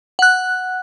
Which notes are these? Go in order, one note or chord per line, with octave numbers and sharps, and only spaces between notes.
F#5 F#6